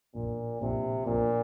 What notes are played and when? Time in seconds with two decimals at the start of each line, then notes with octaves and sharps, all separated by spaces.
0.14 A#1 A#2
0.60 A#1 C3
1.06 A#1 A#2